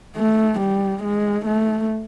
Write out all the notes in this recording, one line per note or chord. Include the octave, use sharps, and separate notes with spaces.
A3
G3
G#3
A3